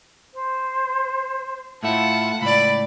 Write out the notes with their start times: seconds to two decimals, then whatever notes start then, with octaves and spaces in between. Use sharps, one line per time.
0.34 C5
1.83 A2 A3 E4 F4 F#5 A5
2.41 C#2 A2 D5 B5